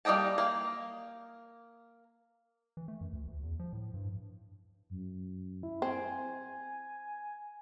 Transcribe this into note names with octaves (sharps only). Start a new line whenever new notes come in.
G3 A#3 D#5 G5 A5
A#3
E3
A3
F#2
D2
D2
E2
F3
A2
G2
F#2
E4
C4 G#5